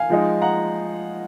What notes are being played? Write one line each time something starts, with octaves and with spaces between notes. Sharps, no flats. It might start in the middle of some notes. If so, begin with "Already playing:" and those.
Already playing: F5 G#5
F3 G#3 D#4
F#5 A#5